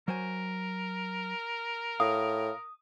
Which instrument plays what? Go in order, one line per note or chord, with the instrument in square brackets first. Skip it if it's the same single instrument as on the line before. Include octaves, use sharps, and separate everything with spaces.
[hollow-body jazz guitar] F#3 C5 G#5 [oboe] A#4
[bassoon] A2 [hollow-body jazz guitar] F5 [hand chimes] D#6